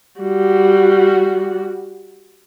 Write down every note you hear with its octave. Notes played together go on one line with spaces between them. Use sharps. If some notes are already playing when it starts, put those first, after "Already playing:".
G3 F#4